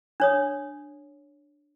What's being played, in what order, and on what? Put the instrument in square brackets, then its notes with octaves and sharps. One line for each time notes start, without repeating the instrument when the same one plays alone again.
[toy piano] D4 C#5 D#6